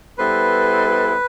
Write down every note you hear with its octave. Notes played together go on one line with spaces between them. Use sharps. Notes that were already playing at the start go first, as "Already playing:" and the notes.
G3 B3 E4 A4 B4 C5